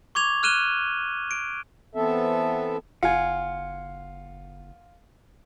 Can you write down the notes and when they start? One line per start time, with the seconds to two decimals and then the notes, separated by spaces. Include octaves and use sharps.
0.15 C#6 D6 G#6 F7
0.43 F6 F#6 D#7 E7 G7
1.31 D7
1.95 E3 B3 C4 A4 E5
3.03 F#1 F4 F#5 G#5